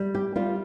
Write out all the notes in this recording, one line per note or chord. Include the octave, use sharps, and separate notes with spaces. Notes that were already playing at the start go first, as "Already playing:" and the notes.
Already playing: G3
G4
G3 F4